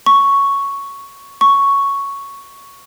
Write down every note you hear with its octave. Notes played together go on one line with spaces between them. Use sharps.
C#6
C#6